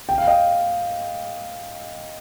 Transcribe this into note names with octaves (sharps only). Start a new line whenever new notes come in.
G5
F5
D#5 G5